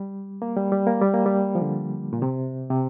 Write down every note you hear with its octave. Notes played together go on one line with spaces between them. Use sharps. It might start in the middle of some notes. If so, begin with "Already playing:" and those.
Already playing: G3
A#3
G3
G3
A#3
G3
A#3
G3
F3
D3
A#2
C3
C3